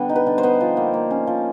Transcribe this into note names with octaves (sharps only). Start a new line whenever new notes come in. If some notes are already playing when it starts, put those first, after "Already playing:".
Already playing: D3 G3 B3
D#4
B4
D3
C5
B3
F3
A#3
A#3
C#4
F3